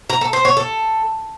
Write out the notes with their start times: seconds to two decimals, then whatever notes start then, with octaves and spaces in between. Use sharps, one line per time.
0.10 A#5
0.21 A4
0.33 C5
0.45 C#5
0.57 A4